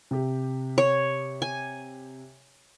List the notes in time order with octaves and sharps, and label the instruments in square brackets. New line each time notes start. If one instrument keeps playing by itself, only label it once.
[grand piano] C3 G4
[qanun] C#5
G#5